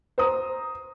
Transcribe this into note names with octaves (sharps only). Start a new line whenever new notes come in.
C5 A#5 D#6